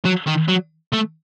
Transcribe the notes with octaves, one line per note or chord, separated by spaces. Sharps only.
F#3
D#3
F#3
A3